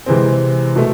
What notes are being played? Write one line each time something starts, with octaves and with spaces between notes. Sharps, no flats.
C3 E3 G#3 C4
B2 A3